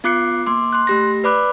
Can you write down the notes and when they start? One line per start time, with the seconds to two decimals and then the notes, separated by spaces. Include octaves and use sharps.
0.04 B3 F4 D6 F#6 C7 C#7
0.47 A#3 C6 D6
0.73 C6 F#6
0.87 A3 G4 A#6
1.24 B4 D5 B5 D6 F#6